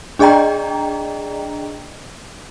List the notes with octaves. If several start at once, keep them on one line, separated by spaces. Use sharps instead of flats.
D4 G#4 D5 D#5 G5 A#5